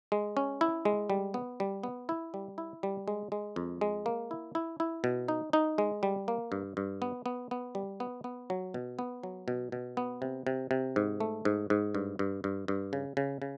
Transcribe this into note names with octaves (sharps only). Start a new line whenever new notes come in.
G#3
C#4
E4
G#3
G3
B3
G3
B3
E4
G3
E4
G3
G#3
G#3
F2
G#3
A#3
E4
E4
E4
B2
D#4
D#4
G#3
G3
A#3
G2
G2
B3
B3
B3
G3
B3
B3
F#3
B2
B3
F#3
B2
B2
B3
C3
C3
C3
G#2
A3
G#2
G#2
G2
G2
G2
G2
C#3
C#3
C#3